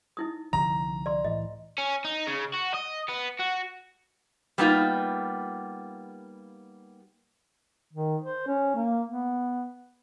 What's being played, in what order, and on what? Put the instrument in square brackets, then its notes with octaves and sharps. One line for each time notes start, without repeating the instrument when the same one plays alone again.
[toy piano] D#4 E4 D#6
[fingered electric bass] C2 D3 F3 [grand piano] A#5
[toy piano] D5 C6
[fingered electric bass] A2 E3 [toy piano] D#5
[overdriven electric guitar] C#4
D#4
C#3
F#4
D#5
B3
F#4
[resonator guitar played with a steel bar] G3 A#3 B3 D#4 F4
[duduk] D#3
C5
C#4
A#3
B3